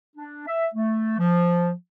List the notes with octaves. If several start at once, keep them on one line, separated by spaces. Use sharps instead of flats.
D4
E5
A3
F3